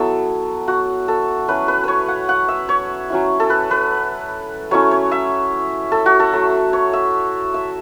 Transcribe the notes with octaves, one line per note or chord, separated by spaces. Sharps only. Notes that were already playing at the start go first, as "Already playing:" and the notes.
Already playing: F#3 B3 E4 A4
F#4
A4
F#3 C#4 E4 B4
B4
B4 C#5
F#5
F#5
E5
C#5
F#3 C#4 E4
A4
B4
B4
F#3 A3 C#4 E4 C#5
C#5
E5
A4
F#4
A4
F#3 A3 E4
C#5
E5
E5